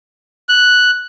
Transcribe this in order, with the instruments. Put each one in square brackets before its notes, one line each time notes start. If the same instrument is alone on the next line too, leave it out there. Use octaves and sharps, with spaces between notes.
[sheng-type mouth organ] F#6